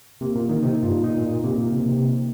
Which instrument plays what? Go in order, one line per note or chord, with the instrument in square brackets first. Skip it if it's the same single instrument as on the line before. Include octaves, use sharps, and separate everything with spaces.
[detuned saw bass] C3 [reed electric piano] A#3
[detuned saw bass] A#2
D#3
[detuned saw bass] C3 [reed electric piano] D#4
[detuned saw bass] G2 [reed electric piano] F4
[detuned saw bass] A#2 [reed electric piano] D#4
[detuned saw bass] A#2
A#2
[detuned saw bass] C3 [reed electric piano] A#3
[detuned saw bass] A#2
C3
C3